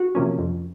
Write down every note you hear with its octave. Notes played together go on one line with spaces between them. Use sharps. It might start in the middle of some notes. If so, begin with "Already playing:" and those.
Already playing: F#4
C3 F3 A#3 C#4
F2